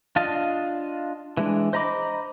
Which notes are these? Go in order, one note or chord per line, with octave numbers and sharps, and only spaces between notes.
D4 F4 D#5 F5 A5
E3 G#3 D4
C5 D#5 A#5 B5 D6